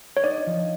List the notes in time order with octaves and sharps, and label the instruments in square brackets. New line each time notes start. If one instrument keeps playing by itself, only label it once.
[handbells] C#5
[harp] D#4 [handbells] D5
[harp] F3